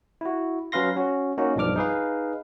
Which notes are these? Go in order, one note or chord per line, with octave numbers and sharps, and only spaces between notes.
E4 F#4
F#3 C#4 B4 F5 C6 A#6
C#4 F#4
A#3 C#4 D#4 F#4
B1 G2 F3 D4 D6 F6
D#4 G#4 B4 F5